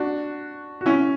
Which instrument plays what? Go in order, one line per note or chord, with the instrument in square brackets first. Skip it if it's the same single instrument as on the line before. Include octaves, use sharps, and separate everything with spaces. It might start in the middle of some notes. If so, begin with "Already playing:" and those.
Already playing: [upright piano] D4 F#4
F#4
C#4 E4